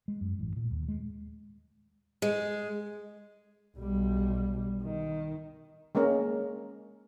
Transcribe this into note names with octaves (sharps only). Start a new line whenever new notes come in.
G#3
F#2
A1
A#2
D#2
G#3
G#3
B1 G3
D#3
G#3 A#3 C#4 A#4